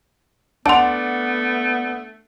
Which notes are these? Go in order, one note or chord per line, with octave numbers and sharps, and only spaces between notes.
A3 B3 D4 F#5 A5 C6